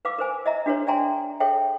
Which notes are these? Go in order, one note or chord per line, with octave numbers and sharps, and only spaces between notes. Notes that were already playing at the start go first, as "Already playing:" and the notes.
B4 F5 D6 E6
A#4 C5 G#5
D#5 E5 A#5
D4 F#4 G#4 B4 C#5
D5 E5 G5 G#5 A#5 C6
G#4 A4 C#5 E5 G5